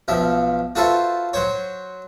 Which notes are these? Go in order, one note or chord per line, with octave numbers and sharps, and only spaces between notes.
B1 F3 E5
F4 F#4 A4 B4 C5 E5
F#3 C5 C#5